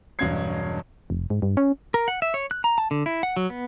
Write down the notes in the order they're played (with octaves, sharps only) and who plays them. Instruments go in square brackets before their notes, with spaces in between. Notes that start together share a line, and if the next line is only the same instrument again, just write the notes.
[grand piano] E1 G2 F#3 C#4 G#6 C7
[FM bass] F1
G#2
G2
C#4
[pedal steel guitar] A#4
F#5
E5
C#5
F#6
A#5
A5
D3
E4
F#5
F#3
B3